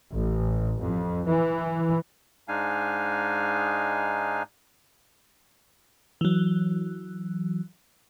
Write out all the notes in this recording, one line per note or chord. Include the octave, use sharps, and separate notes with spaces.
A1
F2
E3
G#2 G#3 D4 D#4 F5 G#5
E3 F#3